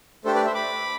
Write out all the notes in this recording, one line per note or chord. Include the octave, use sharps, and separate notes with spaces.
A3 D4 G4 A4 C5
B4 D5
C5 E5
B5 D6